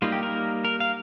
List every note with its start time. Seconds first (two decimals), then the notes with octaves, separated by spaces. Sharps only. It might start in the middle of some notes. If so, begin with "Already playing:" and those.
0.02 G3 A#3 D#4 F4
0.12 G4
0.23 A#4
0.65 A#4
0.80 F5